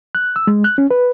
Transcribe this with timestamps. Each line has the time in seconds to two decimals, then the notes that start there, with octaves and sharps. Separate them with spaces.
0.15 F#6
0.36 E6
0.47 G#3
0.64 F#6
0.78 C#4
0.91 B4